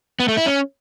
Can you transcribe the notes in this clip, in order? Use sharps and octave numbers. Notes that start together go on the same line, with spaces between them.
B3
A3
E4
C#4